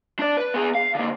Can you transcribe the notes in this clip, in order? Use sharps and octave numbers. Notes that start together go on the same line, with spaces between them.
D4 D5
B4
B3 G#4
F5
D3 A#3